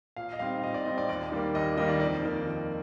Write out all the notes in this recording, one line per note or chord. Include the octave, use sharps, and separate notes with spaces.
A#2 F5
D#5
G3 C4 D#4 F5
A#2 D#5
D5
G3 C4 D#4 D#5
D5
D#2 D5
D#3 G3 A#3
D#2 D#5
D#3 G3 A#3 D#5
D5
F2 D5
D#3 A#3 D#4
F2